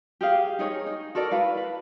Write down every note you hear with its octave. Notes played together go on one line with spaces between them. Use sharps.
G4 G#4 F5
D#4 G#4 C#5
D#4
F#4 A4 A#4 D5
E4 B4 F5
B4